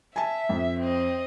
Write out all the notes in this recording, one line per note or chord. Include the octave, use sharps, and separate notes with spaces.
E5 G#5 A5
F2
C4 D#5